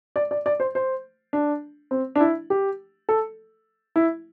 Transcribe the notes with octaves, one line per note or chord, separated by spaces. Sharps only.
D5
D5
D5
C5
C5
D4
C4
D4
E4
G4
A4
E4